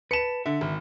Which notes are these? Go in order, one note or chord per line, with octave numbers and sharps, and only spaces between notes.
B4 A5 C#7 E7
D3 E5
G#1